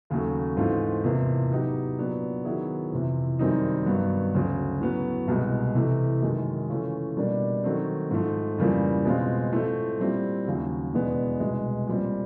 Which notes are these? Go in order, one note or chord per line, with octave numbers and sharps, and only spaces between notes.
D#2 C#3 F#3 A3
G#2 E3 A3 C4 F4
E2 C3 F3 A#3
A2 F#3 B3 D#4 G4
A#2 F#3 B3 D4
D#3 F#3 B3 E4 G#4
F2 C3 E3
F#2 D#3 G3 C4 D#4
G2 D#3 F#3 B3
D2 C#3 F#3
A2 F#3 B3
C2 B2 G#3
C3 E3 A3
F#2 D#3 G#3
C#3 E3 A3 C#4 F4
B2 G3 A#3 D4
D#3 F#3 A3 C4
G#2 F3 A3
F2 C#3 E3 G3 A#3
B2 G#3 C4 F4
A2 F3 A3 C4
A#2 G3 C4 E4 G4
D#2 C#3 F#3
E2 B2 G#3 B3 D4
C2 B2 G#3
A#2 G3 C4